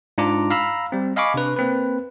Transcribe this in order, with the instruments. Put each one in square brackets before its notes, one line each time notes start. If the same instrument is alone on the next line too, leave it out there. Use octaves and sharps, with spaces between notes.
[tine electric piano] G#2 D4 F4 A#5 D6
F5 A#5 B5 E6
G3 C4
D#5 F5 G#5 B5 C#6 D6
C3 D4 B4
A#3 C4 B4